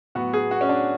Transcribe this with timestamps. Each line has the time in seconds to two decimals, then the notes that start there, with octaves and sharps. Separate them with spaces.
0.15 A2 F#3 B3 F#4
0.33 G#4
0.51 F#4
0.61 C#4
0.69 D4